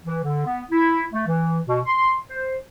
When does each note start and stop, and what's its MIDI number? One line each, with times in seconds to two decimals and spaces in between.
0.04 0.18 52
0.23 0.44 50
0.44 0.61 59
0.71 1.02 64
1.13 1.22 57
1.26 1.58 52
1.66 1.78 47
1.85 2.13 84
2.29 2.56 72